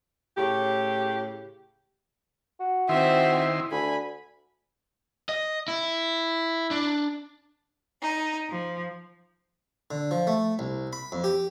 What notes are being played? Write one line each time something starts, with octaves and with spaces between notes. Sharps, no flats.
A2 C#3 G4
F#4
D#3 C4 E4 E5 C6
D2 G#5 B5
D#5
E4
D4
D#4
F3
D3
F3
A3
C2
B5
F2
G4